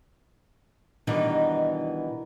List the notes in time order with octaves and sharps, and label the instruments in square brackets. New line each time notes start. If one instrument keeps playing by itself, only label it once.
[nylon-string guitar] B2 D#3 E3 G3 D4 D#4